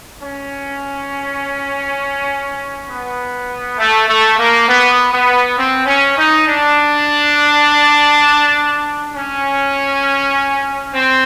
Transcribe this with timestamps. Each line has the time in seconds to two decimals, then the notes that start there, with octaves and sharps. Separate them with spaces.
0.21 C#4
2.89 B3
3.78 A3
4.08 A3
4.37 A#3
4.68 B3
5.12 B3
5.57 C4
5.86 C#4
6.17 D#4
6.46 D4
9.15 C#4
10.93 C4